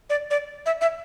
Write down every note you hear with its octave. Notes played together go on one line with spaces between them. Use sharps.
D5
D5
E5
E5